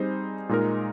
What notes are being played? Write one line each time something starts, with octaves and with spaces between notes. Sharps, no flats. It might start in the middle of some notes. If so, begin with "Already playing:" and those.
Already playing: G3 C4 D#4 G#4 C5
A#2 G#3 D#4 A#4